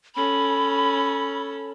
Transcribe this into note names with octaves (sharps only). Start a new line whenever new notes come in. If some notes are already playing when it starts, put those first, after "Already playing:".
C#4 A4 B5